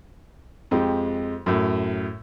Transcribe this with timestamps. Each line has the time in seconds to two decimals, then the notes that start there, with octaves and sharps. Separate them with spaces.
0.71 F2 G#3 G4
1.46 F#2 A2